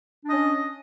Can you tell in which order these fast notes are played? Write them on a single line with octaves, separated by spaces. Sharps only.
D4 D#5 C#4